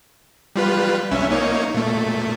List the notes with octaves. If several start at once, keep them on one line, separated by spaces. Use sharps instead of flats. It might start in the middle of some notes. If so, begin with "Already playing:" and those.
G3 F4 B4
B1 C#4 E5
A#3 D#4 C#5
A#2 A3